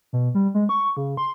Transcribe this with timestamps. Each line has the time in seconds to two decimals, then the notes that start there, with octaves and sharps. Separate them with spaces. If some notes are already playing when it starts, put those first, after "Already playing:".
0.13 B2
0.35 G3
0.54 G#3
0.69 C#6
0.97 C#3
1.17 C6